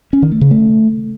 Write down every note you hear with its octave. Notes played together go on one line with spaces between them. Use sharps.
C#4
D#3
A3
C#3
A3